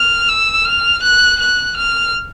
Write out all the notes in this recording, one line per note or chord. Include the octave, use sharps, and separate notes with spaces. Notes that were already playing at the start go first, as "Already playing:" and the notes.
Already playing: F6
E6
F6
F#6
F#6
F6